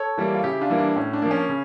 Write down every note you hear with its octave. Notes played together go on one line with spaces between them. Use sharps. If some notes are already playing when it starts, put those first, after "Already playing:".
Already playing: A4 C#5
E3 G3 A#3
F4
C#3 E4 G4
D4 F4
E3 G3 A#3
D4
A2 C#4
D4
F3 A#3
C#4
C#3